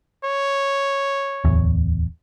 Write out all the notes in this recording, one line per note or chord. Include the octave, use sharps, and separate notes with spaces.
C#5
D1 E2